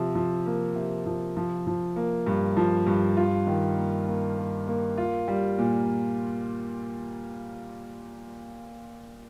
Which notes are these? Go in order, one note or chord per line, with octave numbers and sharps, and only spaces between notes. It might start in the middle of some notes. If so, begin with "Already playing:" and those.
Already playing: C3 F3
F3
A#3
C3
F3
F3
F3
A#3
G2
F3
G2
F4
D#3
A#3
A#3
A#3
A#3
F4
G3
A#2